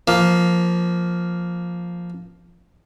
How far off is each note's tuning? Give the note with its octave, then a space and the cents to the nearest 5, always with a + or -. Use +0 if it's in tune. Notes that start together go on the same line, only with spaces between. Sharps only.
F3 +0 A#3 +0